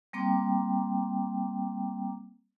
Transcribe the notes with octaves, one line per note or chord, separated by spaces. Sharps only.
G3 A#3 C4 G5 A#5 D6